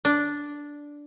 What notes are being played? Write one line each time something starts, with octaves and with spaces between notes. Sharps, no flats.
D4